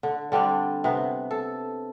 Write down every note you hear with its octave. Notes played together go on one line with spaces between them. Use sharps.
D3
D3 G3 C4 D4
C3 B3
A4